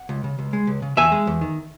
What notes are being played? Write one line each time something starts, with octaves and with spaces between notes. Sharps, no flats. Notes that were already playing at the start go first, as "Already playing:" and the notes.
Already playing: F#5
C#2
C#3
C#2
G#3
C#2
C#3
E2 E5 G#5
G#3
E2
D#3